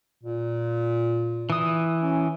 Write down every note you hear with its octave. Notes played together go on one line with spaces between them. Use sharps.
A#2
E3 D#6
C#4